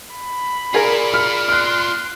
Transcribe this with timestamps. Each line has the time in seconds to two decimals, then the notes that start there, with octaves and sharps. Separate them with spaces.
0.16 B5
0.74 F4 G#4 A#4 D5
1.14 F6
1.48 C6 F6 F#6